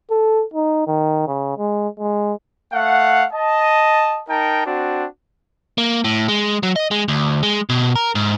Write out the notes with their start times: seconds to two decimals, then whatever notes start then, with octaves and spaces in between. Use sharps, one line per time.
0.10 A4
0.54 D#4
0.87 D#3
1.27 C#3
1.58 G#3
1.99 G#3
2.73 A3 F5 F#5
3.33 D#5 A5
4.29 D#4 A#4 G5 A5
4.66 C4 D4 F#4
5.78 A#3
6.04 A2
6.28 G#3
6.63 F#3
6.76 D#5
6.91 G#3
7.08 D2
7.43 G#3
7.69 B2
7.95 A#4
8.15 G#2